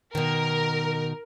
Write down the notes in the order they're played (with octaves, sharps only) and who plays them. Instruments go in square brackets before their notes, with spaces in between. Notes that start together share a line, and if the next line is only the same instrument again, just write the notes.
[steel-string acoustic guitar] B2 D#3 [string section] A#4